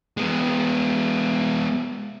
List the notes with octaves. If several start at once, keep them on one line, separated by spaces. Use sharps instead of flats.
G#3 B3